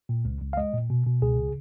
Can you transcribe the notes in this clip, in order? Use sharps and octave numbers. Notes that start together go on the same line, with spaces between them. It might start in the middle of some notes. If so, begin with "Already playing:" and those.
A#2
C#2
C#2
F5
G#3 D#5
A#2
B2
B2
C#2 G#4
C#3